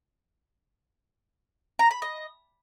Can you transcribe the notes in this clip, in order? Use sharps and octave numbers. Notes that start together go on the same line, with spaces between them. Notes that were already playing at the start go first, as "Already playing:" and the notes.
A#5
B5
D#5